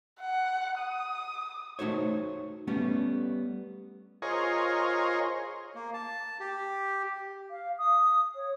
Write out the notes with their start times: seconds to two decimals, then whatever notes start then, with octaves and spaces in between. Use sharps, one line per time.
0.20 F#5
0.79 D#6
1.79 A3 D#4 F#4 C5 C#5
2.67 G3 A3 B3 C#4
4.22 F4 G#4 A#4 C5 C#5 D#5
5.75 A#3
5.94 A5
6.40 G4
7.50 F5
7.78 D#6
8.35 C#5